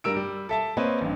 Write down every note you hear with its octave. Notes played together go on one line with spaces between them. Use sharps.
G2 G3 A#4 E6 D7
G3
A4 E5 A5
A#3 C4 B4 C#5 D#5
A1 G2